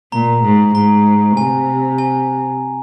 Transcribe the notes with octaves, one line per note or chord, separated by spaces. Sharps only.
A#2 A#5
G#2
G#2 A#5
C3 G#5
G#5